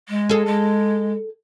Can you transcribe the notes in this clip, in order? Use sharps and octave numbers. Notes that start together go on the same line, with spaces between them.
G#3
G#4 A4
G#3